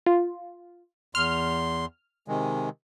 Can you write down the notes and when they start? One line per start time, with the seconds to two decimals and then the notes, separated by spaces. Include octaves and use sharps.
0.06 F4
1.15 E2 C6 F6
2.28 C3 D#3 G#3